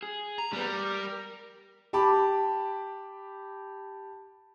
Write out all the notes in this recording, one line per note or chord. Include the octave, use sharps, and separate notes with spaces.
G#4
A#5
G3 G#3 B3
A#4
G4 A5 B5 D6